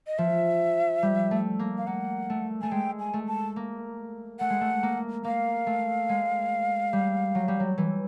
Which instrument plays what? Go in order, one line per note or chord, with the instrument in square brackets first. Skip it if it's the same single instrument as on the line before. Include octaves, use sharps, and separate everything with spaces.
[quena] D#5
[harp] F3 [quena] E5
[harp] G3
A3
A#3
[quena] F5
[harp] A#3 [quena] F#5
[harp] A3
[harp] A3 [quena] G#5
[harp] G#3 [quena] G5
[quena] G#5
[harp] A3
[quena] A5
[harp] A#3
[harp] A3 [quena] F#5
[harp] G#3
A3
A#3
[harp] A#3 [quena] F5
[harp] A3
G#3
G3
F#3
G3
F#3
E3